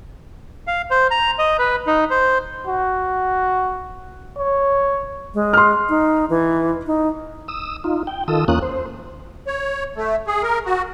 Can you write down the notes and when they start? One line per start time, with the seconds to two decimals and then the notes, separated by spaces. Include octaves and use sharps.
0.67 F5
0.91 C5
1.11 A#5
1.39 D#5
1.59 B4
1.87 D#4
2.10 C5
2.67 F#4
4.38 C#5
5.34 G#3
5.53 C6 F6
5.89 D#4
6.30 E3
6.87 D#4
7.48 D#6 E6
7.84 D#4 F4
8.07 G5
8.28 D#3 F4 A4 D#6 E6
8.48 E2 A#3 C#4 F4 D#6 F#6
8.62 C5
9.47 C#5
9.96 A3
10.27 G#4
10.43 A#4
10.66 F#4